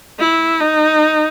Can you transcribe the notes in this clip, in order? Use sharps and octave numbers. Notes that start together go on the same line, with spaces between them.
E4
D#4